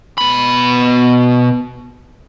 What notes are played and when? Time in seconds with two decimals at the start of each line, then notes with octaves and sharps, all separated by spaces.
0.18 B2 B5